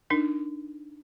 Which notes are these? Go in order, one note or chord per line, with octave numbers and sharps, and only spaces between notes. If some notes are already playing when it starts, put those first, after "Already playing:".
D4 D#4 A#4